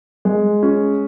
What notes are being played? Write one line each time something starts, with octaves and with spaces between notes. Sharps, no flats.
G#3
C#4